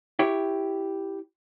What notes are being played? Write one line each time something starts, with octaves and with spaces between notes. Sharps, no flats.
E4 G4 C#5